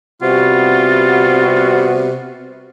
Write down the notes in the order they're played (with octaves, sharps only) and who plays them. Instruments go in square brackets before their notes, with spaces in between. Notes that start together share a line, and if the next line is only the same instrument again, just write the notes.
[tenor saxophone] C3 [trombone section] G3 B3 F#4 [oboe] F4